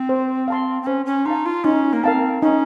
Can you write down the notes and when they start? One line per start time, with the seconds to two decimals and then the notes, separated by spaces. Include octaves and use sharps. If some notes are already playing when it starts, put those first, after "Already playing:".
Already playing: C4
0.09 C5
0.48 F5 A5 C6
0.82 C4
0.87 C#4 C5
1.06 C#4
1.26 D#4 F5 A5 C6
1.46 F4
1.64 C#4 D#4
1.93 A#3
2.03 C4 A#4 F5 A5
2.42 C#4 D#4